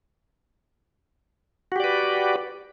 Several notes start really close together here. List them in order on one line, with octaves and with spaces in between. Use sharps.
F#4 G4 D5 B4